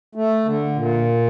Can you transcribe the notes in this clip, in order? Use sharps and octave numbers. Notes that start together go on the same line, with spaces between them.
A3
D3
A#2